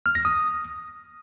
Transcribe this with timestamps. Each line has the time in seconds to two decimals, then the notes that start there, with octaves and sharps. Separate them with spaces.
0.06 F6
0.15 A#6
0.25 D#6